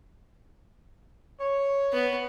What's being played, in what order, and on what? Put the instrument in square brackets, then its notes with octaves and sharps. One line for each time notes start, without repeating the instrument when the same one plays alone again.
[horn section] C#5
[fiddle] B3